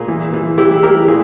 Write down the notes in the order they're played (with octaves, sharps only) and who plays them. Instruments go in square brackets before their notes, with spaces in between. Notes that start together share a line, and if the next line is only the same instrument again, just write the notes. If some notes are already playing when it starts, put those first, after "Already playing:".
Already playing: [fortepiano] A#2 G#4
E3
E3
E3 E4 G4
E3 G4 A#4
A#2 G#4